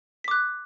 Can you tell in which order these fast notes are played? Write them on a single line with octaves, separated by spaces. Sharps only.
B6 D6 F#6